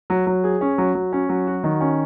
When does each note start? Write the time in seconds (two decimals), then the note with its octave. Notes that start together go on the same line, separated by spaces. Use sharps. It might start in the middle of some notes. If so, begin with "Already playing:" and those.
0.10 F#3
0.27 F#3
0.44 G#4
0.61 C#4
0.78 F#3
0.95 F#3
1.13 C#4
1.29 F#3
1.47 F#4
1.64 D#3
1.81 C#4